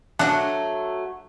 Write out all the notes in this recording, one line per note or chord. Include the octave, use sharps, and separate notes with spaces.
F#3 A3 D4 F#5